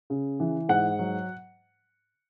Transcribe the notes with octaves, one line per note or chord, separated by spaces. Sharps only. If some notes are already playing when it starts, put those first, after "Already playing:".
C#3
E3
G#2 F#5
F#3